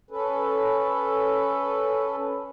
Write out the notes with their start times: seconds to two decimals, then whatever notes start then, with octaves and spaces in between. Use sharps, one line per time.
0.11 C#4 A4 B4